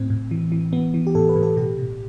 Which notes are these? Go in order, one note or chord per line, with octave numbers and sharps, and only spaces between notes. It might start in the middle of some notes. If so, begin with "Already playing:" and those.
Already playing: A2 C4
A2
E3
E3
E3 B3
E3
G4
A2 A4
B4
A2
A4
B2 G4
B2